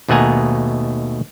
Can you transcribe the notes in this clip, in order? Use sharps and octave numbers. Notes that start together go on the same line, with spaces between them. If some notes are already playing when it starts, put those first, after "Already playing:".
D#2 B2 A3 F#5 G#5 A#5